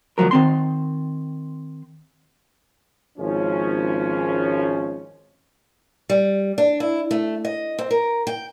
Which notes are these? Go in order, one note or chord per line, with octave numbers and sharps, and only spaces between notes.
D2 F3 F#3 A#4
D#3 C4 C6
G#1 F3 C#4
G3
D4
E4
A3
D#5
C4
A#4
G5